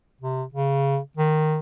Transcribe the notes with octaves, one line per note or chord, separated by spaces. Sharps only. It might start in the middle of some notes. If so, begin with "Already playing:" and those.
C3
C#3
D#3